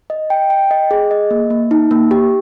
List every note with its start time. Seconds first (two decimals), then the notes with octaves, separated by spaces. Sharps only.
0.10 D#5
0.30 G5
0.50 G5
0.71 D#5
0.91 G#4
1.11 D#5
1.31 A#3
1.50 A#3
1.71 D#4
1.91 A#3
2.11 G4